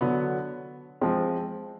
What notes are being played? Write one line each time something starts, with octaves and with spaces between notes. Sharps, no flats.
D3 F#3 B3
F3 G#3 C4